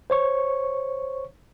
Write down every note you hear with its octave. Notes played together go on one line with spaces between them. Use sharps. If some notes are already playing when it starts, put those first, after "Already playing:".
C5 C#5 C#6